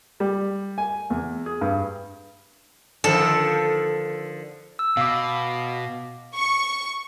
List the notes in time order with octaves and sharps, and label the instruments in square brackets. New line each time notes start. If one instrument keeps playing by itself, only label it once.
[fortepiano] G3
G#5
E2
G#4
G2
[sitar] D3 D#3 F3 [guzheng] A4
[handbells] E6
[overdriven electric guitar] B2 [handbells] F5 D6
[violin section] C#6